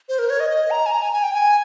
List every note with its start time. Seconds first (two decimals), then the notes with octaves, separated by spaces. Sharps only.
0.09 C5
0.19 A#4
0.30 C#5
0.40 D#5
0.50 D#5
0.71 A#5
0.86 G#5
0.92 A#5
1.02 G#5
1.13 G#5
1.23 G5
1.33 G#5